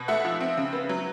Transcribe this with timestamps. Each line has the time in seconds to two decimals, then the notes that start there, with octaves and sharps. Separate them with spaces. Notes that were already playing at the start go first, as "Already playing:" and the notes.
Already playing: B2
0.08 A3 E5 F#5
0.25 F3
0.41 C4
0.57 C#3
0.73 B3
0.89 F#3